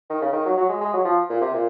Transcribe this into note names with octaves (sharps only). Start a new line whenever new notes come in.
D#3
C#3
D#3
F#3
F#3
G#3
G#3
F#3
F3
A#2
C3
A#2